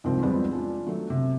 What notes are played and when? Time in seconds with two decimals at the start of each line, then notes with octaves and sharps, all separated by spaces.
0.04 C2 G#2 F3 C4
0.22 E2 F3 G3 G#3 B3 C4
0.51 C#4 D4 F4
0.87 F#3 A3
1.10 C3